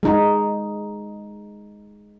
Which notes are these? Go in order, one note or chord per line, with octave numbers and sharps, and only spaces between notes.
G#3 D#4